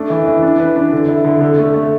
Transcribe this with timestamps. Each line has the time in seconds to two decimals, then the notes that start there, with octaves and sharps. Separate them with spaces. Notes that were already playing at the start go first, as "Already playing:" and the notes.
Already playing: A3 D4
0.10 E3
0.27 E3
0.42 D4
0.60 B4
0.76 D4
0.92 D3
1.08 E4
1.25 D3
1.41 D3
1.58 A3
1.74 A3